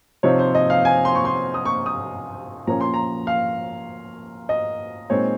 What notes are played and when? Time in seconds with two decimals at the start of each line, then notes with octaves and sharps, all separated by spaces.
0.23 C3 F3 C4 D#4 C#5
0.39 C5
0.55 D#5
0.70 F5
0.85 G#5
1.05 C6
1.15 C#6
1.25 C6
1.54 D#6
1.65 C#6
1.86 D#6
2.67 A#2 F3 A#3 C#4 A#5
2.81 C6
2.94 A#5
3.27 F5
4.49 D#5
5.10 A#2 G#3 C4 D#4 C#5